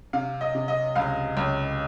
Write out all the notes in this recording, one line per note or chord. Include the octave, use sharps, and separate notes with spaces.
C3 F5
D#5
C3
D#5
C#2 F5
C#2